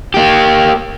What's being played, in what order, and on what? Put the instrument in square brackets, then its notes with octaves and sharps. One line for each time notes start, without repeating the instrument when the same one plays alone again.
[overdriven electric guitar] A#3 G4